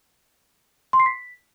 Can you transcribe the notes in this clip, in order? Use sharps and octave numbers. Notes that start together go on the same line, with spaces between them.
C6
C7
B6